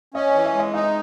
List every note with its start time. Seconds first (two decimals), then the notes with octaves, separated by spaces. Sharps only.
0.14 C#4 D#5
0.30 E3 D#5
0.45 E5
0.54 G#3
0.59 D#5
0.74 D#4 D#5